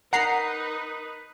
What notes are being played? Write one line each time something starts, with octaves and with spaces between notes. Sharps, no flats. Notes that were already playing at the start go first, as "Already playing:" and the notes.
D#4 A#4 B4 F#5 A#5 C7